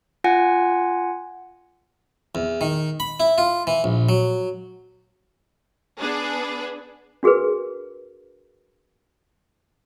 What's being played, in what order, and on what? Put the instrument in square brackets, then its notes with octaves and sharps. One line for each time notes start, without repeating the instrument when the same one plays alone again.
[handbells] F4 F#5 G#5
[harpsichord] E2
D#3
B5
E4
F4
E3
A#1
F#3
[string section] B3 D4 G#4 B4
[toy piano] D4 F#4 G#4 A#4 B4